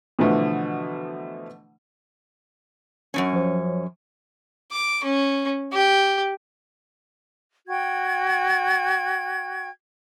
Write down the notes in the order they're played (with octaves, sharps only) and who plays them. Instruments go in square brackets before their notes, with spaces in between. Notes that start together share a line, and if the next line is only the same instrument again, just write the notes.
[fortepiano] B2 D3 E3 F3 A3
[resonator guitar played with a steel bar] F#2 B2 C#4
[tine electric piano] F3 C5
[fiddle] D6
C#4
G4
[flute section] F#4 G5 G#6